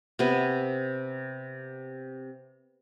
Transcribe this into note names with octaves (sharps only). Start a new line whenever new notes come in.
C3 B3